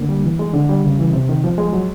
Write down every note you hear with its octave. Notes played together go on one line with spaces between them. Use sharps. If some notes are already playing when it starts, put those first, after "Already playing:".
Already playing: D3 A#3
G3
E3
G#3
D3
G3
C#3
E3
C3
D#3
F3
G#3
F#3